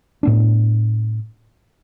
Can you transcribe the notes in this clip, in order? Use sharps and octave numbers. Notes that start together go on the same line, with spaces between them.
A2 B3 D4